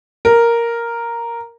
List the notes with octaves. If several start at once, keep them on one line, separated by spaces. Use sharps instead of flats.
A#4